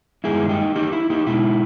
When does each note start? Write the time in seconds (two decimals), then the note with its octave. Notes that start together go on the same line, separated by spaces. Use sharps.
0.24 G2 D#3 G#3 E4 G#4
0.49 D#4 G4
0.76 D#4 G4
0.92 E4
1.10 D#4 G4
1.27 B2 G#3 D#4 E4